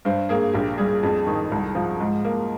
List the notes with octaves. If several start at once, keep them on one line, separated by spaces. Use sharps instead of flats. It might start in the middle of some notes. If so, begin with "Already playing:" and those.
G2 C5
A#3 G#4
A#1 G4
G3 G#4
F2 G#4
D#3
C2
F3
G#2
A#3